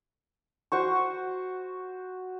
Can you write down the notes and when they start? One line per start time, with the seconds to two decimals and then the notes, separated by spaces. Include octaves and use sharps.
0.72 F#4 C5 C#6